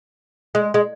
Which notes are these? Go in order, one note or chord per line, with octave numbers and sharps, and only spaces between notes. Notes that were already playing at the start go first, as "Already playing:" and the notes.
G#3
G#3